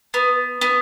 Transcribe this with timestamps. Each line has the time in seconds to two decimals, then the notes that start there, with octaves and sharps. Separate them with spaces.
0.14 B3
0.61 B3